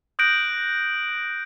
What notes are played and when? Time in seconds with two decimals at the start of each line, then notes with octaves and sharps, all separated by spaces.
0.19 D#6 F#6 G6 A#6 D7 F#7